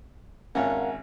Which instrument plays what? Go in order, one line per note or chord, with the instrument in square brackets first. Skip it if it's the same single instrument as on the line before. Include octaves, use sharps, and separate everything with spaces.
[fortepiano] G#1 C#4 [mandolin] F4 F#5 [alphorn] A#4 [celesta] E5 G#5